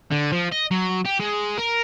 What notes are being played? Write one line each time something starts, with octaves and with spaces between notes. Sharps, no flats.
D3
F3
D#5
F#3
G4
G#3
A#4